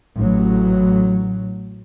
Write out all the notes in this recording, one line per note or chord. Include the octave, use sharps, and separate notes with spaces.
A1 F#3